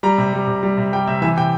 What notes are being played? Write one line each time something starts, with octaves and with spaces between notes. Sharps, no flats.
G3 A#5
C3
G3
C3
G3
C3
G3 G5
C3 E5
E3 E5
C3 G5